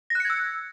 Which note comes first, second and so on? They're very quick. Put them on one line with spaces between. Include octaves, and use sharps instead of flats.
A#6 F#6 C#7 G#6 E6